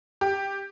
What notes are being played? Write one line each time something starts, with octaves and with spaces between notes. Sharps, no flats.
G4